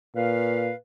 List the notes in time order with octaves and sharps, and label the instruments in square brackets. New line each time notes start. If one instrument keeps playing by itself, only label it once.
[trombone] A#2 [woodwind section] B4 F5